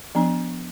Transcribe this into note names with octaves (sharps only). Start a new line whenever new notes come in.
F3 B3 D4